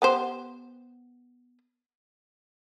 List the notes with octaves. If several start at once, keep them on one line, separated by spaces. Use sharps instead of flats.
B3 G4 C5